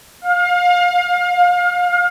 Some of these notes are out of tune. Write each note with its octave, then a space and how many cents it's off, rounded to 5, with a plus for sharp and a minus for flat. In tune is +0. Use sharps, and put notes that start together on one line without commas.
F5 +30